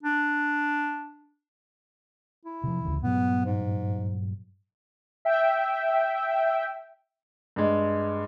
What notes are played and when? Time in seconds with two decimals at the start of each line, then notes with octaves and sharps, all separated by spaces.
0.03 D4
2.45 E4
2.63 C3 F3
2.83 D2 C#3 E3
3.03 G2 A#2 F#3 B3
3.45 G#2
5.25 E5 G5
7.56 G2 G#3